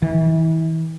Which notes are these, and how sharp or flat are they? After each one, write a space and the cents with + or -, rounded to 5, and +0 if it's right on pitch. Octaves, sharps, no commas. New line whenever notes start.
E3 -35